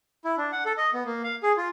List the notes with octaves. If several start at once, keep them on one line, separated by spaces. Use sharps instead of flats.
E4
D4
F#5
A4
D#5
B3
A#3
F5
G#4
F4